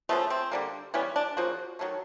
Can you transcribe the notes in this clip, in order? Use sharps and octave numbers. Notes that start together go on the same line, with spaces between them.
C#3 F3 A3 B3
C4
D3 G3 A#3
E3 G3 B3 C#4
D4
C#3 F3 A#3 F#4
D#3 F#3 A3